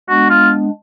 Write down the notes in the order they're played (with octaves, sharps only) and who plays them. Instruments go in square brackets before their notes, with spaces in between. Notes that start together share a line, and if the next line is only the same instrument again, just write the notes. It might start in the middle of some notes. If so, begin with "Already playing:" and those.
[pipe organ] G#3 B3 D4 [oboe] F#4
[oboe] F4